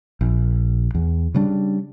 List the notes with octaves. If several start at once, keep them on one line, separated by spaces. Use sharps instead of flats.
A#1
E2
C#3 G3 D4